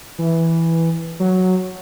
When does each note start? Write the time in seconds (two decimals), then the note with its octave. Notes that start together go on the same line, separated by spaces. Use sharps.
0.19 E3
1.20 F#3